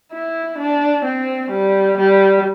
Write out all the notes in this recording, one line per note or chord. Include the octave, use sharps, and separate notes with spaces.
E4
D4
C4
G3
G3